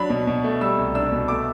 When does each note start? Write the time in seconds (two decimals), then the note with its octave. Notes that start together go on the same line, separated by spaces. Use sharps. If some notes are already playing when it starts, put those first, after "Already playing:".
Already playing: F#3 D4 B5
0.10 B2
0.27 B2
0.44 A3
0.61 G3 E6
0.78 C2
0.95 D4 E6
1.12 B2
1.28 A3 D6